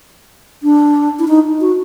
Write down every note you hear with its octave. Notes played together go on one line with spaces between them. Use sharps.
D4
E4
D#4
F#4